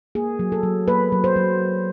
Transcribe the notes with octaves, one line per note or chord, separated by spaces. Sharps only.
A#3 G#4
F#3
A4
F#3
A#3 B4
F#3
C5
F#3